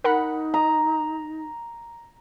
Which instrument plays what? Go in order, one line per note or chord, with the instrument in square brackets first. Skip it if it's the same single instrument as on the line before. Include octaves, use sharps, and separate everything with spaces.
[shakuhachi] D#4 [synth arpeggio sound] A#4 F#5 B5
[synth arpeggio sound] D#5 [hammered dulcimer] A#5